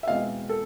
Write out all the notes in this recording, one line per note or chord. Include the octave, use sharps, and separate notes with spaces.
E5
E2 B2 G#3 C4 D#5 F5
A4